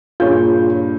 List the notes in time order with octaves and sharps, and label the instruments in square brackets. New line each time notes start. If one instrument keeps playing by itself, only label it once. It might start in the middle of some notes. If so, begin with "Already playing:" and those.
[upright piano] G2 A#2 G6 [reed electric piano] F4 G#4 C#5